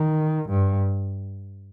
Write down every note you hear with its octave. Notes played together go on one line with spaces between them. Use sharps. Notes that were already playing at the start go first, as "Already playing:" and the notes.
Already playing: D#3
G2